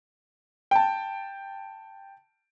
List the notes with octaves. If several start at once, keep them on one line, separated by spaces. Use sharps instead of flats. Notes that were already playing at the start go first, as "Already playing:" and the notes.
G5 A5